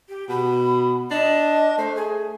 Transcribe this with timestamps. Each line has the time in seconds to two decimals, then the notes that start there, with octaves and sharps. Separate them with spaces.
0.09 G4
0.29 B2 B5
1.11 D4 D#5
1.78 A3 C5
1.96 G#4